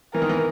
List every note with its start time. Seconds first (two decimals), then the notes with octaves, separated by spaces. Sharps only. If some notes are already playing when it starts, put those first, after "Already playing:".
0.13 E3 A#4
0.22 D#3
0.29 E3